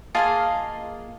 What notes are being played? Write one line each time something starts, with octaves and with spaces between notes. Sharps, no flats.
A#3 F4 G#4 D#5 F5 A5